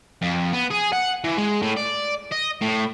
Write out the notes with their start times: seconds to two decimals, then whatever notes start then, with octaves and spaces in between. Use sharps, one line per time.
0.22 F2
0.53 B3
0.71 G#4
0.93 F#5
1.24 E3
1.38 G#3
1.62 A2
1.77 D5
2.31 D#5
2.61 A2